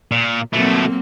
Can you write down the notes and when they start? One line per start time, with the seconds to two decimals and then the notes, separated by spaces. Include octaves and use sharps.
0.12 A#2
0.54 B2 F#3 A3 A#3 C4